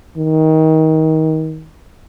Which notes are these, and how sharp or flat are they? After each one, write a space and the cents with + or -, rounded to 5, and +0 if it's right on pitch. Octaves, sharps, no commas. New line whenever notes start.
D#3 +25